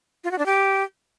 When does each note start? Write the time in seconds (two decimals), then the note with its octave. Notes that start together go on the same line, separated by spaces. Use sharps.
0.24 F4
0.31 F#4
0.39 D4
0.46 G4